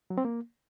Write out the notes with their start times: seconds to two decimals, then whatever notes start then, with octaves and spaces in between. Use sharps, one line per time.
0.10 F#3
0.18 C4
0.25 A#3